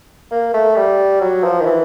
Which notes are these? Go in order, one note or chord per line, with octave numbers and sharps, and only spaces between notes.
A#3
A3
G3
F#3
F3
D#3
E3